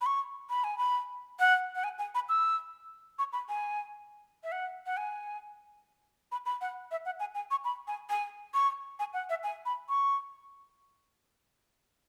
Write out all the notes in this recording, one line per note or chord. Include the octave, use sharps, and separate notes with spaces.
B5
C#6
B5
G#5
B5
F#5
F#5
G#5
G#5
B5
E6
C#6
B5
G#5
E5
F#5
F#5
G#5
B5
B5
F#5
E5
F#5
G#5
G#5
C#6
B5
G#5
G#5
C#6
G#5
F#5
E5
G#5
B5
C#6